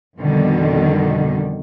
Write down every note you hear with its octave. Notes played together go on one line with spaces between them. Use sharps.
F2 B2 D3 D#3 G3